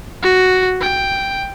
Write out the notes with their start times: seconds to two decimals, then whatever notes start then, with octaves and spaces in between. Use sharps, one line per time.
0.22 F#4
0.81 G5